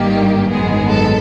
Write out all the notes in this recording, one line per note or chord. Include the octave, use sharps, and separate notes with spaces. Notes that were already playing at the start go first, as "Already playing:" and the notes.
Already playing: G#1 G2 D#3 G3 A#3 G4
G#1 F#2 D#3 G#3 B3 G#4
A4